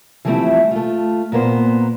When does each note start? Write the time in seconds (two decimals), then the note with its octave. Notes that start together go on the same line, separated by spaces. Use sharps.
0.25 E3 F3 G3 A3 C4 E4
0.71 A3 F4
1.32 A#2 A#3 B3 C5